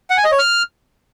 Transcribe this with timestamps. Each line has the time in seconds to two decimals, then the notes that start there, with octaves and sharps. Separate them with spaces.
0.10 F#5
0.17 G#5
0.25 D#5
0.32 C#5
0.39 F6